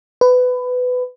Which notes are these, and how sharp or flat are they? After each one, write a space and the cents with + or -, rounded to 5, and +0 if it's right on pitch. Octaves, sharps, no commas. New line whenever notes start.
B4 +20